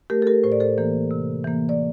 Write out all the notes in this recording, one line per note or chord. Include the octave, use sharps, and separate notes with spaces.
A3 G4 A#4
A4
G4 A#4
A2 C5
D5
A4 C5
E3 A#3
C3
E3 A#3
D5